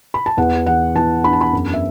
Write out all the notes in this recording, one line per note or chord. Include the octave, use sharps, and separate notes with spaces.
B5
A5
E2 F#5
E3 F#5
E2 A5
D4 B5
A5
B5
F#2
E5